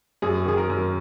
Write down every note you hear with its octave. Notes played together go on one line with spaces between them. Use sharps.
F#2 G#4
D#3 G#4
A#4
F#2